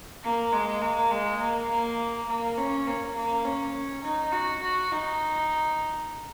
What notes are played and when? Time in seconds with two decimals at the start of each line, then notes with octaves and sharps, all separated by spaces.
0.23 A#3
0.52 G#3
0.81 A#3
1.10 G#3
1.40 A#3
1.69 A#3
2.28 A#3
2.57 C#4
2.86 A#3
3.16 A#3
3.45 C#4
4.03 D#4
4.32 F#4
4.62 F#4
4.91 D#4